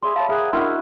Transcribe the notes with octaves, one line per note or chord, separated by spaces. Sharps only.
G#4 D5 E5 B5 C6
C#5 F5 A5
G#4 A#4 E5 F#5
C#4 D4 E4 F#4 A#4 D#5 C6